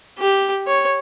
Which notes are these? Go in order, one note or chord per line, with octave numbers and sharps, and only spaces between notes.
G4
C#5